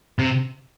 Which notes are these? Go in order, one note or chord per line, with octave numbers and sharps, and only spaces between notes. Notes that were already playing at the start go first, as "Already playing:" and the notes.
C3